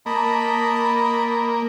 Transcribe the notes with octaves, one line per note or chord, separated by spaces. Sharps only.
A#3 D#5 A5 B5